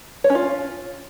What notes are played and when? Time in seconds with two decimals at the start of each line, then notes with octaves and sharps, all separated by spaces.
0.24 C#5
0.30 C#4
0.35 F4